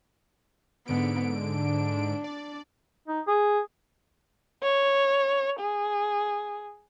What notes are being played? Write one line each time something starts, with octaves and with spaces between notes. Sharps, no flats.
G#2 D3 B3 D7
D4
D5
D#4
G#4
C#5
G#4